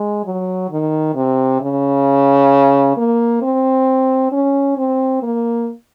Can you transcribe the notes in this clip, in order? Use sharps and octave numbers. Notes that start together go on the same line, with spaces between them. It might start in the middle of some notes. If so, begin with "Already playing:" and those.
Already playing: G#3
F#3
D#3
C3
C#3
A#3
C4
C#4
C4
A#3